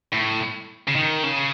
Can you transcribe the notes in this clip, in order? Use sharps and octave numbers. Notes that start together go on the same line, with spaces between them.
A2
C#3
D#3
C#3